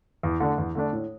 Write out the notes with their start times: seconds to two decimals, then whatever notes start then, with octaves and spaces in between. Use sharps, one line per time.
0.23 E2
0.40 D3 A3 D4
0.58 E2
0.75 D3 A3 D4
0.93 A2